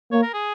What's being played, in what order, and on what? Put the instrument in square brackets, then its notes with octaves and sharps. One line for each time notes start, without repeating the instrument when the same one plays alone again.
[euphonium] A#3 [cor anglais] C#5
[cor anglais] A#4
G#4